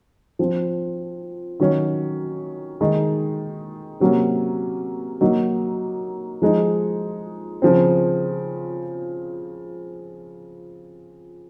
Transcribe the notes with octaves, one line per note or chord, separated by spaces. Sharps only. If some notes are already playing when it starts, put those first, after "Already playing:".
F3 C4 F4
D#3 F#3 C#4
D#3 G#3 D#4
C3 F#3 A#3 C#4
F#3 A#3 D#4
F3 G#3 D#4
C#3 F3 C4